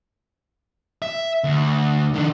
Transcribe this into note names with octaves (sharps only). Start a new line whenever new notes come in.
E5
D2
D#3 D4